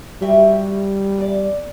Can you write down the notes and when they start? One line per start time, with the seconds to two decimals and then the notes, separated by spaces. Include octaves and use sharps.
0.22 G3 F#4 G4 E5
1.18 E2 D5